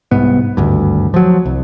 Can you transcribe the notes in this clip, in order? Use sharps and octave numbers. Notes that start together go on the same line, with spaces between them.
C2 G#2 B3
G#1 D2 G2
F3 F#3
C2